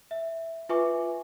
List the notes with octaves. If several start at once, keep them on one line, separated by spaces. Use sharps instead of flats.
E5
F4 B4 E5 G#5 C#6 D6